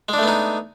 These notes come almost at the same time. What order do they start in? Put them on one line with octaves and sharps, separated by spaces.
G#3 D4 A3 B3 D#4